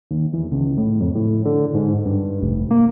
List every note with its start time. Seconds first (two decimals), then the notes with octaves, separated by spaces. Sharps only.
0.11 D#2
0.33 E2
0.52 C#2
0.78 A2
1.00 F2
1.15 A2
1.45 D3
1.74 G#2
2.06 G2
2.42 F1
2.71 A#3